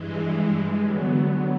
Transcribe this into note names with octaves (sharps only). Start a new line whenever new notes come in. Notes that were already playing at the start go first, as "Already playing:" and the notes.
Already playing: G2 E3 G#3
D3 F#3 B3